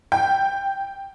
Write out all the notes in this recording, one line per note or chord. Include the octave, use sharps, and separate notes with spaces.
G5